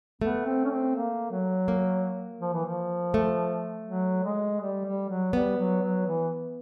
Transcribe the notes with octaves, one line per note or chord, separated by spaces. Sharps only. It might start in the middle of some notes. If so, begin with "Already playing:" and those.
A3 B3
C4
C#4
C4
A#3
F#3
A#3
F3
E3
F3
A3
F#3
G#3
G3
G3
F#3
G3 B3
F#3
F#3
E3